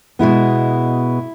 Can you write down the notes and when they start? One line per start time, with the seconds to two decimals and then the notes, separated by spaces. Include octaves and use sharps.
0.19 B2 G#3 B3 E4